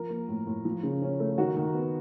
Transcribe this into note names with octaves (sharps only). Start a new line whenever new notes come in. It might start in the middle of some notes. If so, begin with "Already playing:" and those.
Already playing: F3 A#4
A#3
A2
A2
F3
C#3
C#4
A3
D#3 F#4
D#3
B3